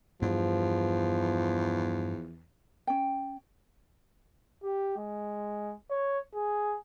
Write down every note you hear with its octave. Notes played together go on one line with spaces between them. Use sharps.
E2 G2 F3
C#4 G5
G4
G#3
C#5
G#4